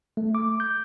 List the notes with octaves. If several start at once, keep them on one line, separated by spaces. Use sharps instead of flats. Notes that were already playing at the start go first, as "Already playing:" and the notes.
A3
D6
G6